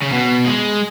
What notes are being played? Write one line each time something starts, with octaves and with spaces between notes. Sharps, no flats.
C#3
B2
G#3